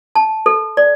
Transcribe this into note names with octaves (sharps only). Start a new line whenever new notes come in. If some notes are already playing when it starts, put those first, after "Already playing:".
A5
A4
D5